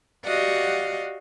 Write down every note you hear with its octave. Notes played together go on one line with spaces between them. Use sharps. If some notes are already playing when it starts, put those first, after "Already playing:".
F#4 G4 D5 D#5 F5 F#5